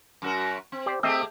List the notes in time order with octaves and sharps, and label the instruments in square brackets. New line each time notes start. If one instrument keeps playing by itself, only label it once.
[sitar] F#2 F#4 A#4
C4
[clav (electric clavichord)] G4 C5 D5
[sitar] A3 G4 G#4 [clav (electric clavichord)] C4 D#5 E5